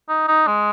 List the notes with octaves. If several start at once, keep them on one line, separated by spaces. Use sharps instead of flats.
D#4
D#4
G#3